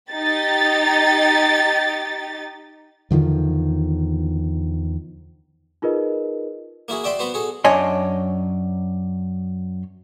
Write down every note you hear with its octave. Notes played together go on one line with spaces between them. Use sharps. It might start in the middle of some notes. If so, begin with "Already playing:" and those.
D#4 G4 A6
E2 D3 D#3 F3
D#4 F4 G#4 A#4 B4 D#5
A#3 E4 F#4 G#4
F#4 D5 E5 G5 C6
B3 F#4 B4 C5
F#4 G#4 A4
F#2 D4 C#5 D#5 G#5 C6